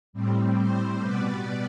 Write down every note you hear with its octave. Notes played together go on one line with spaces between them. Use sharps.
A2 G3 C4
C5
B2 G3 B3 B4 D5